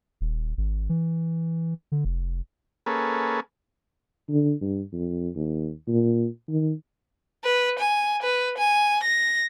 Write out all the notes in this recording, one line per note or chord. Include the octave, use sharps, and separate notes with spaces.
D#1
G#1
E3
D3
F1
A#3 C#4 G#4 A4 B4
D3
G2
F2
D#2
A#2
D#3
B4
G#5
B4
G#5
A#6